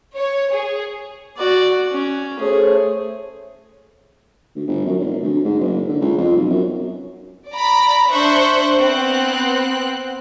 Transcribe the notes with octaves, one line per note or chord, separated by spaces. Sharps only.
C#5
G#4
F#4 D5
C#4
A3 G#4 C5 C#5
D2
G1
F#2
F1
D2
G#2
F#1
D3
C#2
F2
B1
F#2
D5 A#5 B5
D4 C5 E5 C#6 F#6
B3 C4 F#6